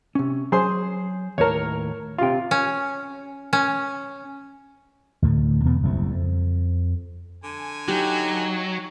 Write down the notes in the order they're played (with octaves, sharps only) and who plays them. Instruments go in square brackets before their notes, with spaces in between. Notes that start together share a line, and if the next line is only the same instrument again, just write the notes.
[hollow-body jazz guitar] C3 C#4
[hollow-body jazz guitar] F#3 [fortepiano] G#4 C5 C6
[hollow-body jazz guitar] D#2 A2 A5 [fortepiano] A#4 C#5
[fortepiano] C3 F4 [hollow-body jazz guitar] F5 G5
[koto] C#4
C#4
[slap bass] D2 A2 D3
E2 B2 B3
F#1 C2 C3
F2
[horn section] D3 G#5
[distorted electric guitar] F#3 [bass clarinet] D#4 [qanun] G4